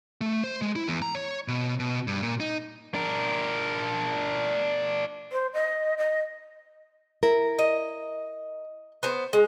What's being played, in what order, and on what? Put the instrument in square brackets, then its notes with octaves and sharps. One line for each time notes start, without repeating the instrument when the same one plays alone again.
[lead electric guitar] A3
C5
G#3
E4
E2
A#5
C#5
B2
B2
G2
A#2
D#4
D4 A#4
[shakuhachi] C5
D#5
D#5
[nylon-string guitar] E4 A#4
[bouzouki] D#5
B3 C5
G#3